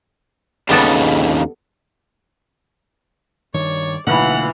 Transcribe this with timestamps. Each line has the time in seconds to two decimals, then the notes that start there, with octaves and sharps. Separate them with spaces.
0.69 D#2 C#3 G3 B3 A4
3.54 G2 D#3 C#5 D5
4.07 B1 D3 E3 A3 A#3 F4 F#5 B5